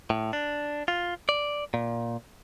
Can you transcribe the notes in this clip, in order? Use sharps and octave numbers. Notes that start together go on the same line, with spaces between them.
A2
D4
F4
D5
A#2